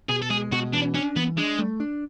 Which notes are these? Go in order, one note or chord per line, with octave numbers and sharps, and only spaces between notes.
B2 G#4
A4
G#3 G#4
B2 F#4
E3 D4
C#4 D4
E3 B3
G#3 D4
A3
D4